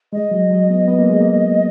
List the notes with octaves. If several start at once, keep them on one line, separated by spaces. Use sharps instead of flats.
G#3 D#5
F#3
F#3
B3
B3
A#3
G#3
A#3